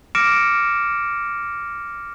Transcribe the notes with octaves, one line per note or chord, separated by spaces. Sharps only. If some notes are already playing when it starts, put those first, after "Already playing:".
D6 F6 A#6 C#7 D7 E7